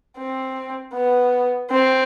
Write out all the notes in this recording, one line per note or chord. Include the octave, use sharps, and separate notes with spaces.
C4
B3
C4